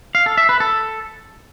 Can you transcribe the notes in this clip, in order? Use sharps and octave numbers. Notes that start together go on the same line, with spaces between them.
F5
A4
E5
B4
A4